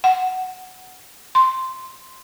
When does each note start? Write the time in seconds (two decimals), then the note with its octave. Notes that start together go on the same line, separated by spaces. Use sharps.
0.04 F#5
1.35 C6